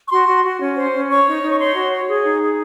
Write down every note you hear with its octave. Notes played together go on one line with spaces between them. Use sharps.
C#6
F#4 C6
F#4
F#4
C#4
C5
C#4
C#5 C#6
D#4
D#4
C#6
C#5 C6
F#4
C#5
G#4
D#4
G#4